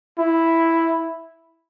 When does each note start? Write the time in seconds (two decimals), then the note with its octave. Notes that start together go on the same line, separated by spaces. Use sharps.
0.19 E4